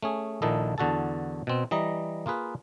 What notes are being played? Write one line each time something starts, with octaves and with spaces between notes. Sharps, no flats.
A3 C#4 G#4
A#1 A#2 D#3 E4 A4 D#5
E2 D3 F#4 A4 A5
B2 C4
E3 G3 D#5 A#5
A#3 F4 G#4 B4